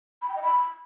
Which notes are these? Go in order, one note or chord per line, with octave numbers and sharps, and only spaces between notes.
B5
G5
D#5
B5